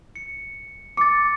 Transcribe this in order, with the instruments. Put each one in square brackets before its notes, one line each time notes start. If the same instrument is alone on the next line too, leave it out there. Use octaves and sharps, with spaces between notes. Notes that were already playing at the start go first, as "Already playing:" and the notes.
[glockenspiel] C#7
[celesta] D6 [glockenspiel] A6 C#7